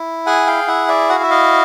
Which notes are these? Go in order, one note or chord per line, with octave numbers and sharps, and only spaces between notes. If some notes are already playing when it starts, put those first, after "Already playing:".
Already playing: E4
G#4 F#5 G#5
F5 G5
E4 E5 F#5
D5 E5
F#4 F#5
F5
E5
D#5 F5